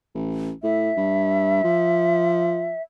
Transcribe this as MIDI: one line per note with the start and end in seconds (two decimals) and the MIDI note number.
0.14 0.52 33
0.63 0.91 45
0.63 2.82 76
0.97 1.62 43
1.64 2.72 53